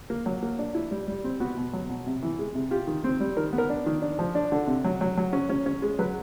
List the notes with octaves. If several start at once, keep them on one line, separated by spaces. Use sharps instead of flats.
A#3
F#3
A#3
D4
E4
G3
G3
C4
B3 F#4
B2
F#3
B2
C3
E3
G#3
C3
F4 G4
D#3
C4
G3
D#3 A#4
B3
A#4
D4
D#3
D4
F3
D4
D3
C3
F#3
F#3
F#3
C#4
C#4
C#4
G#3
F#3 B4